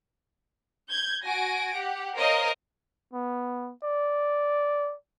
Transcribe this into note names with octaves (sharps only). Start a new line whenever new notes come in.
G6 G#6
F#4 G#5 A#6 D7
G4 F#5
A#4 C5 C#5 D#5 F5
B3
D5